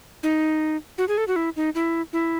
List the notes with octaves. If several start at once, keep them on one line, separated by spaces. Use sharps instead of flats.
D#4
F#4
G#4
A4
F#4
E4
D#4
E4
E4